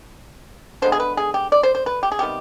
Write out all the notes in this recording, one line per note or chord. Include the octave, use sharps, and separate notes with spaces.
D3 G#3 B3 C5
G#4
B4
G#4
G4
D5
C5
C5
B4
G4
G#4
C3 D#3 G3 B3 G4